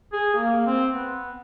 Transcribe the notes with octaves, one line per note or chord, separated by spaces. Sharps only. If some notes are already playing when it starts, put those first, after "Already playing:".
G#4
A#3
C4
B3